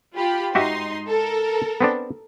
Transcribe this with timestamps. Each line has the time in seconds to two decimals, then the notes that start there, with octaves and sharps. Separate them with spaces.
0.15 F4 G4 B5
0.55 G#2 D#4 F#4 G4 E5 C6
1.08 A4 A#4
1.81 B3 C4 D4